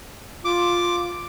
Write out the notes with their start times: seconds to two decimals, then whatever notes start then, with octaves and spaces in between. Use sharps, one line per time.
0.45 F4 D6